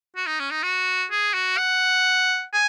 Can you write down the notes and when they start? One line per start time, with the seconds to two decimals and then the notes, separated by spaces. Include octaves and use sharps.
0.16 F#4
0.27 D#4
0.40 C#4
0.51 D#4
0.63 F#4
1.11 G#4
1.34 F#4
1.58 F#5
2.53 G#5